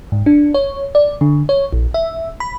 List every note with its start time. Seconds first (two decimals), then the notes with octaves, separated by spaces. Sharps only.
0.12 G#2
0.26 D4
0.54 C#5
0.95 D5
1.21 D3
1.49 C#5
1.73 A#1
1.94 E5
2.40 B5